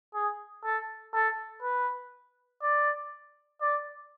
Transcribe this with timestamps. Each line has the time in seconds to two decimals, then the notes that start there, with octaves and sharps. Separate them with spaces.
0.14 G#4
0.64 A4
1.14 A4
1.62 B4
2.62 D5
3.61 D5